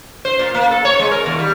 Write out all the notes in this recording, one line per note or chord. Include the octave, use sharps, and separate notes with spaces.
C5
A#2
A#3
A4
C#5
G#3
A#4
D#2
G3